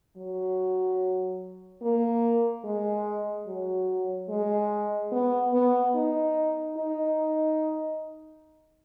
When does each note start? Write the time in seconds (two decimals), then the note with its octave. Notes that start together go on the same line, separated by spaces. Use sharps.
0.17 F#3
1.82 A#3
2.64 G#3
3.47 F#3
4.29 G#3
5.12 B3
5.53 B3
5.95 D#4
6.77 D#4